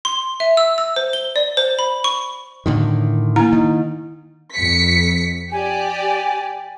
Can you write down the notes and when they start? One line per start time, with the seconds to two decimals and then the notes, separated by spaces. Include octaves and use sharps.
0.05 C6
0.40 E5
0.57 E6
0.78 E6
0.96 C5
1.13 G7
1.36 D5
1.57 C5
1.79 B5
2.04 C#6
2.66 A2 D3 D#3
3.36 A#3 E4 A#5
3.53 D#3
4.55 F2 B6 C#7
5.52 G4 D5 G#5